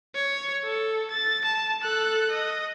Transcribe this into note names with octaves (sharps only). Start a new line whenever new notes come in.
C#5
A4
A6
A5
A4 F#6
D#5